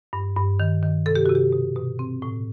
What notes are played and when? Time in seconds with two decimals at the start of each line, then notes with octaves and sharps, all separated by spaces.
0.13 G2
0.37 G2
0.60 D#3
0.83 D#3
1.06 C3 A4
1.16 G4
1.26 C3 F#4
1.35 G4
1.52 B2
1.76 B2
1.99 C4
2.22 A2